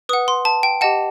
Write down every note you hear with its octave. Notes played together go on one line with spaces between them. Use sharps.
B4 F#5 D#6
C6
A5
G5
G4 D#5 F#5 A5